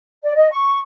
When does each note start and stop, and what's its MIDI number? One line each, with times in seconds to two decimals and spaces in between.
0.23 0.32 74
0.35 0.48 75
0.51 0.79 85